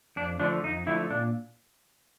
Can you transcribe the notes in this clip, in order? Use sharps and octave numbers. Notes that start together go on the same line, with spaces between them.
F2 D4
D3 F3 A3 D4
F2 D#4
D3 F3 A3 E4
A#2 D4